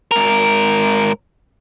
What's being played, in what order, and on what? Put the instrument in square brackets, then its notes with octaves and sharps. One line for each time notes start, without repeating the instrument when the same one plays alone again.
[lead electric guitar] G#2 A#4